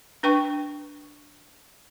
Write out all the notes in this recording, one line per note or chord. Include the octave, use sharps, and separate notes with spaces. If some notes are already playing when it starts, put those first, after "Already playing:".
D4 B4 G5 C#6